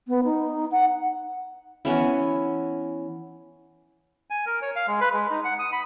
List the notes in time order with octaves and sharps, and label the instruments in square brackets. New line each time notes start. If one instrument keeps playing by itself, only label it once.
[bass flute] B3
D#4
F#5
[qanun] E3 B3 C#4 E4
[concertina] G#5
A#4
C#5
F5
G#3
B4
G#3
D#4
F#5
D#6
B5